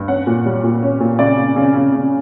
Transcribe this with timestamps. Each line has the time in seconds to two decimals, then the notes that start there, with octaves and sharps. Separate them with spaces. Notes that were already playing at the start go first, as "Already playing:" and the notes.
Already playing: G2
0.08 C#4 F#5
0.27 A#2
0.46 G3
0.64 A#2
0.83 C#4
1.00 A#2
1.19 C#3 D5
1.37 C#3
1.56 C#3
1.74 C#3
1.92 C#3